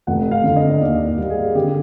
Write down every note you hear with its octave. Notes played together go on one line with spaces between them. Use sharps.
F1 F#5
F5
D3
D#5
D#5
D#2 D5
G3
G#4
D3 G4